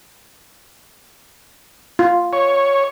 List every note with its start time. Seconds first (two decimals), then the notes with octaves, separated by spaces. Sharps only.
1.99 F4
2.33 C#5